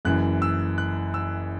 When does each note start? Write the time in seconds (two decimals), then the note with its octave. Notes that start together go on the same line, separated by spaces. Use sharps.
0.05 F#1 F#2 E3 F#6
0.42 E6
0.78 F#6
1.14 E6